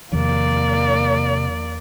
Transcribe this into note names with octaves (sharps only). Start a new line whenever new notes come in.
E2 C3 D#3 F3 A#3 D5